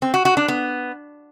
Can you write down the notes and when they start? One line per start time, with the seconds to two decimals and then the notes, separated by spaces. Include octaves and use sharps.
0.02 C4
0.14 F#4
0.25 F#4
0.37 D4
0.48 B3